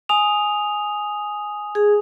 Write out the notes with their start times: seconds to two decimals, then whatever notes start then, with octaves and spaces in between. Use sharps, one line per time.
0.09 G#5 D#6 F7
1.75 G#4